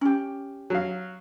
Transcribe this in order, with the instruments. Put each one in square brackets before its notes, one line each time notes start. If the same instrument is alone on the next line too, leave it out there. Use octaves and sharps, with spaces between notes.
[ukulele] C#4 G4
[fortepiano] F#3 F5